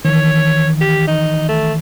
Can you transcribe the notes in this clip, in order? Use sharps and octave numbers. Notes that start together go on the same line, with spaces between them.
D#3 E3 C#5
G4
D#4
A3